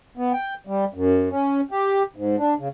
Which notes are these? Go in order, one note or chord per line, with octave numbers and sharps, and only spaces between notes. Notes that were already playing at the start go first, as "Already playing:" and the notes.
B3
G5
G3
F#2
C#4
G4
G#2
D4
C#3